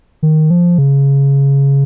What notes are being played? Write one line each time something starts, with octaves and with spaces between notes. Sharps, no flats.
D#3
F3
C#3